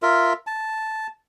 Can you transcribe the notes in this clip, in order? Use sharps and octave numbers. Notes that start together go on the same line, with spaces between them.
F4 A#4 E5
A5